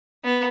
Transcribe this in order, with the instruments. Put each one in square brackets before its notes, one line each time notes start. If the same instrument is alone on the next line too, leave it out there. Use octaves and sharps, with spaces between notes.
[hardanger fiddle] B3